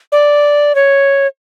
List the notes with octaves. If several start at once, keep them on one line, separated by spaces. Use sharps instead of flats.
D5
C#5